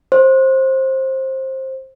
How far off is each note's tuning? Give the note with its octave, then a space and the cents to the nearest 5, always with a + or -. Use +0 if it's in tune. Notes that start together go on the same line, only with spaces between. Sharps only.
C5 +20